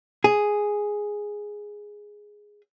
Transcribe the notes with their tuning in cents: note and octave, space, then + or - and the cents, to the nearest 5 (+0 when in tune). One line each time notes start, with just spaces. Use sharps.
G#4 +0